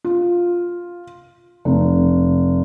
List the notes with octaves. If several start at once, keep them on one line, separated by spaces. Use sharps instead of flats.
F4
F1